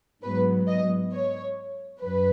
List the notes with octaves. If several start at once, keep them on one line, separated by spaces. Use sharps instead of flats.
G#2 F#3 B3 B4
D#5
C#5
F#2 B4